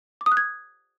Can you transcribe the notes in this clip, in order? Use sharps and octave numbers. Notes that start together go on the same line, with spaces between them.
D6
D#6
F#6
G#6